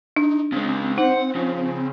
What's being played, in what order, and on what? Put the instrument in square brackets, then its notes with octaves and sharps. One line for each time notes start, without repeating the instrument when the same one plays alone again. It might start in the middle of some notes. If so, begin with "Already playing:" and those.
[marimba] D4 [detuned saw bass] D#4
[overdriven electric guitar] C#3 G#3 [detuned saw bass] C4
[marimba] D#4 [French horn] C5 [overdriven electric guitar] F#5
[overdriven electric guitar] C#3 [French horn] F3